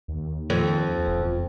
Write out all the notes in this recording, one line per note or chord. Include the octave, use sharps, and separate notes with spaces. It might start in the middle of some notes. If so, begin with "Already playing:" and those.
D#2
F2
E1